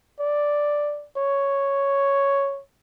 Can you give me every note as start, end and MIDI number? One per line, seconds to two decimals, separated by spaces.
0.20 1.06 74
1.17 2.61 73